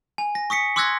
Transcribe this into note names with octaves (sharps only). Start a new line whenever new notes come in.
G#5
A#6
C#6 D#6 B6 C#7
C6 D6 E6 F#6 G#6 A#6